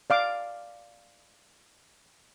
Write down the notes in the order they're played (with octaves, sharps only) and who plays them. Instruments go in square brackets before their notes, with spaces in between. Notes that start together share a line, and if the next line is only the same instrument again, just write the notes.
[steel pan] D5 F5 D6